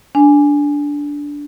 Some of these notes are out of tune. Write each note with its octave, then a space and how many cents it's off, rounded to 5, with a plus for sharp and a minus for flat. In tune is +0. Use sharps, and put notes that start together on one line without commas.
D4 -10 G#5 +0